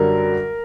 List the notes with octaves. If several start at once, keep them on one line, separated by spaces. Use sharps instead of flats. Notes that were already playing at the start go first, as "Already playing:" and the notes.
Already playing: F#2 D3 G3 A#4